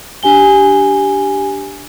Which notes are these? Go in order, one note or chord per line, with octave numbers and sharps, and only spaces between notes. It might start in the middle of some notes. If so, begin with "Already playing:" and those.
D4 G4 G#5 G7